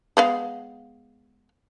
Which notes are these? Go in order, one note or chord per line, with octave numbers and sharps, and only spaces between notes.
G#3 B3 F5